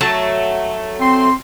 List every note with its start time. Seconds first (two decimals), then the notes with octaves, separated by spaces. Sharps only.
0.01 F#3 A3 A5
1.00 C4 C6